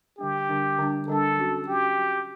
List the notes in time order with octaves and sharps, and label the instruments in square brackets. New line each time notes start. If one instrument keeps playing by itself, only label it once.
[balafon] D3 G3 D4 [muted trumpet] G4
[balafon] D3 G3 D4
D3 G3 D4
[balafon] D3 G3 D4 [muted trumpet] A4
[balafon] F#3 C#4 F#4
[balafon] F#3 C#4 F#4 [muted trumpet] G4
[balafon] F#3 C#4 F#4